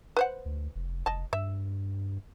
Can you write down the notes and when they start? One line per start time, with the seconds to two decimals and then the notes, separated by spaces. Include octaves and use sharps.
0.17 B4 C5 F#5
0.46 D2
0.75 F1
1.06 F1 D#5 A5
1.33 G2 E5